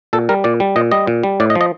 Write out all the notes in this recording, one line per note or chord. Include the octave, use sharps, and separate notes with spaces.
A#2 A4
G3 A#4
A#2 D5
G3
A#2 D#5
G3 D#5
A#2
G3
A2 D5
D#5
F3
D#5